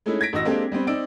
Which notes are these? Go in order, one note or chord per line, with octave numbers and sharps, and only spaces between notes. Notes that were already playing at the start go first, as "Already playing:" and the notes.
G#3 A3 C#4 D#4 E4
G#6 A#6 B6 D7
A1 E3 F#4 D#5 E6 A#6
G#3 A#3 C4 D4 G4 A4
G3 B3 C4
C4 D#4 D5 E6 D7